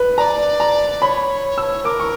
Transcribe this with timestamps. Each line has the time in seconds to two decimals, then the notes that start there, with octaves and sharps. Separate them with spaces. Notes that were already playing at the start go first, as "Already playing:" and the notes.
Already playing: B4
0.18 D5 A#5
0.60 A#5
1.02 C#5 B5
1.58 E6
1.85 A#4 D6
2.00 C#6